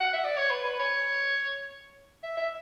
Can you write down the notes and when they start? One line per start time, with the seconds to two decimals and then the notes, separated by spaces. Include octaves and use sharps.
0.01 F#5
0.13 E5
0.24 D5
0.37 C#5
0.51 B4
0.64 B4
0.79 C#5
2.23 E5
2.37 E5